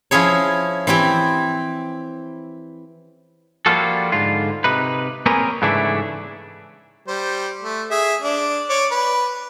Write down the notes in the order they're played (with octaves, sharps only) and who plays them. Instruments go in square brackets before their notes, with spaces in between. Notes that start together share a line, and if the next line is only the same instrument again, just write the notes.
[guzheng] F3 C#4 E4 G#4 C#5
E3 C4 E4 G4
[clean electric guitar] F3 G3 A#3 F4 F#4 A4
G#2 D3 F4
C3 D#4 B4
A#3 C4 C#4 G#4 A#4 B4
G#2 C#3 E3 A3 D4 E4
[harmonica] G3 C5
A3
G#4 E5
D4
C#5 D5
B4